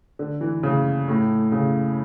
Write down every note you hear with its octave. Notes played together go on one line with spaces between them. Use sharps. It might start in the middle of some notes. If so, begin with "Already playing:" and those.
D3
E3
C#3
A2
C#3